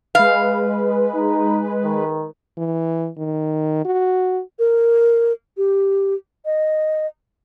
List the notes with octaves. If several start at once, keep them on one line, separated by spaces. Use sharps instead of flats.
G#3 B4 F5
D#4
D#3
E3
D#3
F#4
A#4
G4
D#5